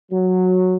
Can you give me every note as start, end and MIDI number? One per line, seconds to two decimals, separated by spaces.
0.10 0.76 54